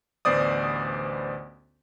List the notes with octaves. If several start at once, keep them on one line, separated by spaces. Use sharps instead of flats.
A1 D2 B3 C5 D5 D#6